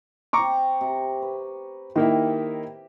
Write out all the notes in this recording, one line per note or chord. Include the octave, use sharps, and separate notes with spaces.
C4 G5 A#5 C#6 D6
C3
B4
D#3 A#3 E4 G4 E5